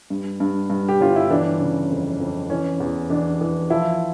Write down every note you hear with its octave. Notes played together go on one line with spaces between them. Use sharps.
G2
G2
G2
G4
G1 F4
E4
E3 D4
C#3
F2
F2
E3 C#4
E2
E3 D4
E3
F3 E4